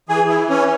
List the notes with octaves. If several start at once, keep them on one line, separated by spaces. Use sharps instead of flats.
E3 G#4
E3 E4
E3
C#4